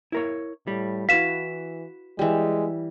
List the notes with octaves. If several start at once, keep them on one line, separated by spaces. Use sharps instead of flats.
E4 A#4 C#5
A2 G3
E3 E4 F#4 B4 F5 B6 E7
E3 G3 G#3